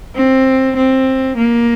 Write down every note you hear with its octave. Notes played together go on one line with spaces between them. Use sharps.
C4
C4
A#3